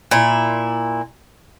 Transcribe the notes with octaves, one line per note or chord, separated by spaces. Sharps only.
A#2 E4